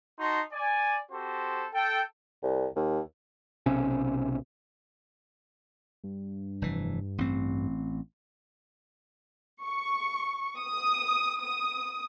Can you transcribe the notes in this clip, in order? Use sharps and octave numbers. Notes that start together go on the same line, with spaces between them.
D#4 F#4 A5 C6
D5 G#5
C4 F#4 G4 A4 C5
A4 G5
C2
D#2
B1 C3 C#4
G2
F1 E3
A1 C4
C#6
D#6
D#6